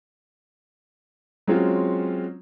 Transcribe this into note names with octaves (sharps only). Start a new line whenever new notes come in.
F#3 G#3 C4 C#4 F4